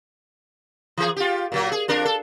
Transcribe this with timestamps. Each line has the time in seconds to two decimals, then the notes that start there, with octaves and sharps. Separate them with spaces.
0.97 E3 G#4
1.16 F4 G4
1.52 A#2 F#3 A#3
1.72 G#4
1.88 F2 D4 A#4
2.05 A4